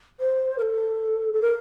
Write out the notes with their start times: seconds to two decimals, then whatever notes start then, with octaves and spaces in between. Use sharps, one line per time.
0.19 C5
0.57 A#4
0.61 A4
1.33 A4
1.41 A#4